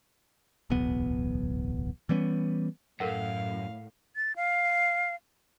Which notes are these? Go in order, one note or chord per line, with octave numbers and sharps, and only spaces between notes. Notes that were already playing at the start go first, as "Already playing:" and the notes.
D1 B1 E2 B3
E3 G3 B3 C#4
F#2 A2 A4 A#4 F5 F#5
A6
F5